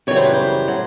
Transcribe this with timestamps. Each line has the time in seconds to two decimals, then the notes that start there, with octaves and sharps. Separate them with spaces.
0.07 F#2 C#3 E3 G3 C#5
0.16 C5
0.25 B4
0.33 C5
0.67 A2 F#3